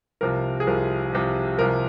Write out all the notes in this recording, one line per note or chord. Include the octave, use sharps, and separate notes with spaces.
C2 C3 F3 A#4
G#4
C2 C3 F3 A#4
C2 C3 F3
C2 C3 F3 A#4